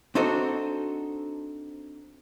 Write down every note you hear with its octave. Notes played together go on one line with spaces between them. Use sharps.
C4 D4 D#4 F#4 A4 C5